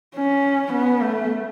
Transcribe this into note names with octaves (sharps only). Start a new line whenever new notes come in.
C#4
B3
A3